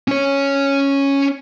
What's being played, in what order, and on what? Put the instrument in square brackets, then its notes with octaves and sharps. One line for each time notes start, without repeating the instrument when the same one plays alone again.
[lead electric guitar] C#4 C#5